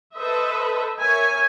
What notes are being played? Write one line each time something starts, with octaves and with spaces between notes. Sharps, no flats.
A4 B4 C5 D#5 E5
A#4 C#5 E5 G#5